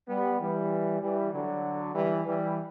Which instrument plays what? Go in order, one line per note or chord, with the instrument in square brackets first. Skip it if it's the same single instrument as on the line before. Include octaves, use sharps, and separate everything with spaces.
[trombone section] G3 B3
E3 G3
E3 G3
D3 F#3
E3 G3
E3 G3